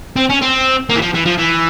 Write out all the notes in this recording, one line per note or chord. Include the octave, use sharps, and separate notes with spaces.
C4
C#4
C4
A#3
E3
F3
E3
F3
E3